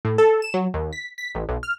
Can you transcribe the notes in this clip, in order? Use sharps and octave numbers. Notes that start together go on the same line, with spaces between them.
A2
A4
E7
F#3
D#2
B6
B6
A1
B1
F6